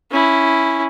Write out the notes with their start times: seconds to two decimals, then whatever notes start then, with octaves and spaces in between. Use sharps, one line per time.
0.11 C#4 E4